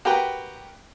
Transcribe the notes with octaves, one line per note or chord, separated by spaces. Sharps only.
F#4 G4 A#4 B4 G5